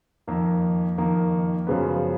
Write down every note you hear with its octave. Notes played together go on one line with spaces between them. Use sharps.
F2 D#3 A#3
F2 D#3 A#3
F#2 C#3 F3 G#3 B3